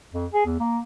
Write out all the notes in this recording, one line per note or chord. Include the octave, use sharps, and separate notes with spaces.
F2
G#4
E2
A#3